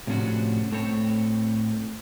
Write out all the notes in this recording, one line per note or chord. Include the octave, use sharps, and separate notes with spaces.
A2 C3 F3 C#4 D4 F#4
A2 A3 C4 C#5 A5